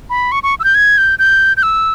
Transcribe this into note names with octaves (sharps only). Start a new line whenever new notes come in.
B5
C#6
C#6
E6
G6
G#6
G6
G6
G6
E6